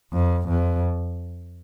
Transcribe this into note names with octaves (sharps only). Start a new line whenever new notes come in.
F2
F2